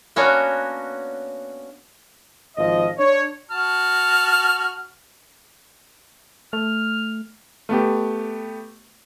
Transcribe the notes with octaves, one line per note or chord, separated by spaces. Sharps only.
A#3 B3 C#4 D4 F#4 C#5
G#1 F3 D#5
D4 C#5
F#4 A5 F6
A3 F6
A3 B3 G4